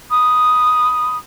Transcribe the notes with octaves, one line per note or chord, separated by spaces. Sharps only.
B5 D#6